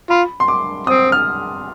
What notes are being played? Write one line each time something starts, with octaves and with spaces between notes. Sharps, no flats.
F4 B5
C6
D6
C4 D#6
F6